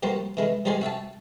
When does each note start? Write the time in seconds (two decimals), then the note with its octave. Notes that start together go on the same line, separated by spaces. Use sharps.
0.03 F3 G3 A#3 F#4 C5
0.37 E3 G#3 E4
0.65 F3 G3 G#3 C5 D5 G#5
0.81 F#4 E5 G5 A5